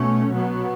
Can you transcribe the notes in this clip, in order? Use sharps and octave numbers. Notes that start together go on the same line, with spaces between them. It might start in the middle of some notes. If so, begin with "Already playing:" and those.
Already playing: B2 A3 C#4
B2 F#3 B3